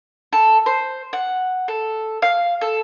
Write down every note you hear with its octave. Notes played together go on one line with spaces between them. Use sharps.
A4
C5
F#5
A4
F5
A4